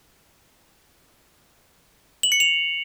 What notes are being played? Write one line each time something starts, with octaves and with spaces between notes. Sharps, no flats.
F#7
C#7
F7